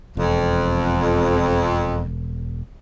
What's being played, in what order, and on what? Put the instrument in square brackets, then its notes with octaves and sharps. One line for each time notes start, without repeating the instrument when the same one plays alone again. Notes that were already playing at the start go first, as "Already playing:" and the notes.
[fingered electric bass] E1 [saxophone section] F2